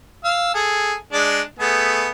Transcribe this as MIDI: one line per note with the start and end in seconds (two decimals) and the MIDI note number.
0.24 0.53 77
0.24 0.53 88
0.55 0.95 68
0.55 0.95 69
1.13 1.41 56
1.13 1.41 62
1.13 1.41 74
1.59 2.10 57
1.59 2.10 59
1.59 2.10 68